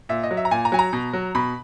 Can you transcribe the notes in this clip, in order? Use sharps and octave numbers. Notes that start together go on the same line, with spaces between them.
A#2 E5
D#5
F#3
E5
A#5
A#2 G#5
A#5
F#3 G#5
A#5
B2
F#3
B2 B5